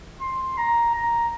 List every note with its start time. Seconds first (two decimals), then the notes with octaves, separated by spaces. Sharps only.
0.21 C6
0.58 A#5
0.95 A#5